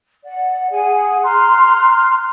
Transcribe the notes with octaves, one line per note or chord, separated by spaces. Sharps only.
D5 F#5
G#4 F#5 G#5
A#5 C6 F6 F#6